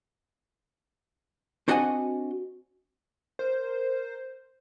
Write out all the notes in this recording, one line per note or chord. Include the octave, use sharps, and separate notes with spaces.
C4 D4 F#4 D#5 F#5 G#5
A#4 C5